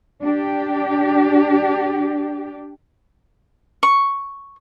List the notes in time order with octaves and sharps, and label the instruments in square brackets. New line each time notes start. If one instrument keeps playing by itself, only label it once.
[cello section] D4 G4
[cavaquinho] C#6